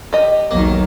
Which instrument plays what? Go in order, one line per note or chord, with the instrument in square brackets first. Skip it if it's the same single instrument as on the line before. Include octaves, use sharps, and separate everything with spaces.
[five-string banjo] G4 D#5
[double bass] B1 E2 [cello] D#3 F#3 [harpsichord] A#3